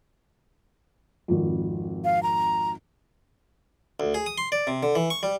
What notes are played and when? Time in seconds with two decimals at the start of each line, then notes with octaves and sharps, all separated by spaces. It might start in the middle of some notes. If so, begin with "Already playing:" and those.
1.28 G#1 F2
2.05 F5
2.23 A#5
4.00 D2
4.14 G#4
4.26 D#6
4.38 C6
4.52 D5
4.67 C3
4.83 D3
4.95 E3
5.10 C#6
5.23 G3